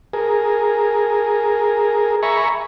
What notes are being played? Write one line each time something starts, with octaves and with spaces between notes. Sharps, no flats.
G#4 A#4
E5 G#5 A#5 B5 C#6